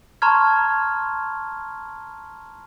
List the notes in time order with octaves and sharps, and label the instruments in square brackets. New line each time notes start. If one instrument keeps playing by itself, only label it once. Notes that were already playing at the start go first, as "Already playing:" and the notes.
[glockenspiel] A5 A#5 C6 C#6 F6 G#6